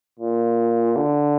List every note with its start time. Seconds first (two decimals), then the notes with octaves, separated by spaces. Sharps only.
0.20 A#2
0.97 D3